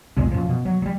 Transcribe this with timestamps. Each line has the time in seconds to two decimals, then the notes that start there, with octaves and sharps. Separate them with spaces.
0.17 B1 E2 A#2 G#3
0.32 F#2 A#2 F3
0.49 B2
0.65 F#3
0.82 F#3 G3